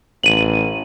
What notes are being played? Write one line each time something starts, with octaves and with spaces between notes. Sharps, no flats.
A1 D#7 F#7